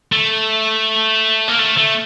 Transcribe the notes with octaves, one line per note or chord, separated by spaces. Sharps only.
A3
A#3
A3
A3